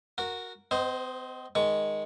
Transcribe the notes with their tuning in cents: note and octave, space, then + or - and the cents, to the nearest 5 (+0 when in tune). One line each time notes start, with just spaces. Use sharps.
F#4 -10 A#4 +0
C4 -45 C5 +0 D#5 +0
D#3 +0 G#3 +0 C#6 +25